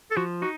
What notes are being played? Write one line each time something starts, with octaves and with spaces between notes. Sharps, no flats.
A4
F3 F#4
D#4 F#4